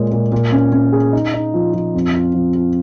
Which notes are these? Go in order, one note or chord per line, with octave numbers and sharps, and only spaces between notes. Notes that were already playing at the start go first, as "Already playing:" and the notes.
Already playing: A#2 G#3 C#5
A#2
A#2
C#4
C#4
G#4
D#4
D#4
F3
F3
F2
F4
F3
F4